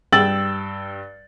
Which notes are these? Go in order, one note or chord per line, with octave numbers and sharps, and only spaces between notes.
G2 G5 E6 A6 F#7